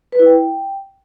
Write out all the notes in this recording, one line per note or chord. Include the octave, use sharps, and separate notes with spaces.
B4
E4
G5